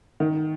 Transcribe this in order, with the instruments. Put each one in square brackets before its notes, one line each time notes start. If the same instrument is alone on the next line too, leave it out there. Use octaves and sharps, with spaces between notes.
[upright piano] D#3